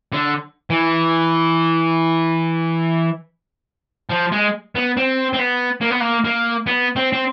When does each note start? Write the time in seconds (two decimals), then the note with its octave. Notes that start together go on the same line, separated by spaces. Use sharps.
0.13 D3
0.70 E3
4.10 F3
4.32 G#3
4.75 B3
4.97 C4
5.33 C4
5.39 B3
5.81 A#3
5.90 B3
6.00 A#3
6.24 A#3
6.67 B3
6.96 C4
7.13 C4